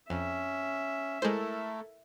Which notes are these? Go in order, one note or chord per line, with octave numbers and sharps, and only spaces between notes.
F2 C#4 E5
G#3 A3 E4 A4 A#4 C5